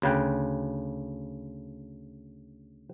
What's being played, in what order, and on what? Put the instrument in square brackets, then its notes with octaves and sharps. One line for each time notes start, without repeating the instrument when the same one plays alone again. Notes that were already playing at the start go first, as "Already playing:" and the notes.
[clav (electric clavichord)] D2 C#3 B4 G5